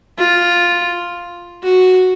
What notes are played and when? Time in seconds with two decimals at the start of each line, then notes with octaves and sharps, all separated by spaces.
0.18 F4
1.63 F#4